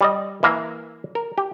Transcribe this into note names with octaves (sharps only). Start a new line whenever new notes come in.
G3 D5 D#5
E3 A#3 A#4 E5 F5
A#4
G4